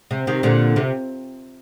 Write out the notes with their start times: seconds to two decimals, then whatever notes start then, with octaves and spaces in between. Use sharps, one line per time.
0.11 C3
0.27 C3 D#3
0.43 A#2 D3
0.76 C3